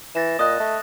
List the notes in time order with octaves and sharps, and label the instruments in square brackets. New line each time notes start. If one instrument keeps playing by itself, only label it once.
[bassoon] E3 [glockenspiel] A6 A#6 E7
[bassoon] A#2 [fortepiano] D#5 [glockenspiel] D#6 F#6
[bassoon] A3